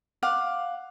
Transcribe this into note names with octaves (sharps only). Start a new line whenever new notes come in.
F5 F#5 D6